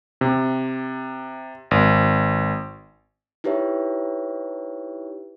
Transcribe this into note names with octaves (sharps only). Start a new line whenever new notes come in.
C3
G#1
D#4 E4 G4 B4 C#5 E5